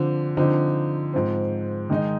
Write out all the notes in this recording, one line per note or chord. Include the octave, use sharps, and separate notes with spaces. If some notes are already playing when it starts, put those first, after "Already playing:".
Already playing: D3 F3 C4
D3 F3 C4 D#4
G#2 F3 C4
D#3 G#3 D#4